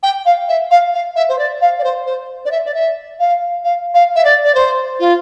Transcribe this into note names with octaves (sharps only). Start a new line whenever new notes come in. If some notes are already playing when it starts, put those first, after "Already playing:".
G5
F5
E5
F5
F5
E5
C5
D5
F5
D5
C5
C5
D5
E5
D5
E5
F5
F5
F5
E5
D5
D5
C5
F4